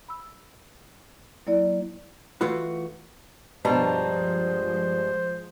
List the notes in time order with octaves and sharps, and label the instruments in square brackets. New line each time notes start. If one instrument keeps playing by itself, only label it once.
[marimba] B5 E6
F#3 A#3 E4 D5
[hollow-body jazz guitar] E3 A3 F4 F#4 B4
[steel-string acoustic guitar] G2 D4 A#5 [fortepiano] B2 [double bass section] F3 G#3 [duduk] C5